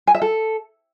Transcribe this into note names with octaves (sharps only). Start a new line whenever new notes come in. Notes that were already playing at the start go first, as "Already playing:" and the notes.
G#5
E5
A4